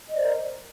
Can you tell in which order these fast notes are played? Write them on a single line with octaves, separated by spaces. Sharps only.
D#5 D5 C5 A#4